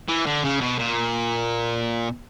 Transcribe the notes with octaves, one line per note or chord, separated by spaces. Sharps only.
E3
D3
C#3
B2
A#2